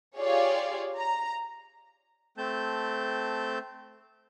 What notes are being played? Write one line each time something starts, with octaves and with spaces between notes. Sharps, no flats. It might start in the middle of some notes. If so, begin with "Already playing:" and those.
F4 G4 G#4 C#5 D5 F5
A#5
A3 C4 A5 G6